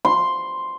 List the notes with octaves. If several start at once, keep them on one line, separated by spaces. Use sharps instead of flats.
C6